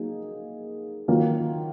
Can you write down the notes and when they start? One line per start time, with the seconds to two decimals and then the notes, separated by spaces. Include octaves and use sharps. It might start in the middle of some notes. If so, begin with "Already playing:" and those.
Already playing: F#3 A#3 D#4 G#4
1.08 D#3 F#3 A#3 F4